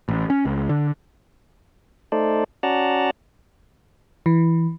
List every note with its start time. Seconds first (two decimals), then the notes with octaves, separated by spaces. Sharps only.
0.09 A1
0.30 C#4
0.45 C#2
0.69 D3
2.12 A3 D#4 A4 C5 D5
2.63 C#4 F#4 D5 F#5 A5 A#5
4.26 E3